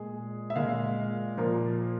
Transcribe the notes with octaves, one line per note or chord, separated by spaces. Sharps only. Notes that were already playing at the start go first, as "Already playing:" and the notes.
Already playing: A#2 G#3 G#4
E5
A#2 G#3 F5
A#2 F3 A#3